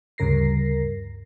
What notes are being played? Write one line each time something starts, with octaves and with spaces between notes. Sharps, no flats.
D2 G2 C#3 A#4 A#6 C7